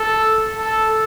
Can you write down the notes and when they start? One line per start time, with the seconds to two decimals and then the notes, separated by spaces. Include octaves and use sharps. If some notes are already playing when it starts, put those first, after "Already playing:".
Already playing: A4
0.57 A4